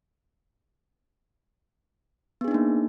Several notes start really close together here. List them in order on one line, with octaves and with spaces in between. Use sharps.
B3 G#4 D4 D#4 A#3